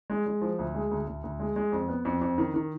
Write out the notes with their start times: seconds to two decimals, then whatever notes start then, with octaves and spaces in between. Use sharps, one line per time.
0.10 G#3
0.26 G#3
0.42 F3
0.58 D2
0.75 G#3
0.91 D2
1.07 D2
1.23 D2
1.40 G#3
1.56 G#3
1.72 F2
1.88 B3
2.05 F2
2.21 F2
2.38 D#3
2.54 D#3